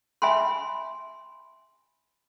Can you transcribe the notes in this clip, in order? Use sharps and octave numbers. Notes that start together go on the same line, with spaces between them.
E5 G#5 B5 C6